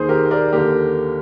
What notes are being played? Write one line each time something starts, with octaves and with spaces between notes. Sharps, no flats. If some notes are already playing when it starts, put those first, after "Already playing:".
Already playing: D#2 D#3 G#4 C5
G4 A#4
A#4 D5
D#2 D3 G4 A#4